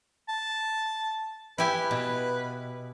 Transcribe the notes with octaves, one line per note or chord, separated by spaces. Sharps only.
A5
E4 G4 B4 G#5
B2